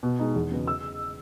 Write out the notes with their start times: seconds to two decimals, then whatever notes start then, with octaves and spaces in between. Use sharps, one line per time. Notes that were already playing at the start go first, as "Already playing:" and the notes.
0.03 B2
0.19 G#3 D#4
0.36 E2
0.51 C#3 F#3 B3
0.67 E6